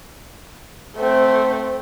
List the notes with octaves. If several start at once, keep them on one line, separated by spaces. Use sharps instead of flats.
A3 C4